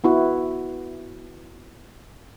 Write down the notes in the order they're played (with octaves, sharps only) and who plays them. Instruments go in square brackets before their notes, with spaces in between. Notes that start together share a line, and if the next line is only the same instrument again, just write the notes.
[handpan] B3 E4 F#4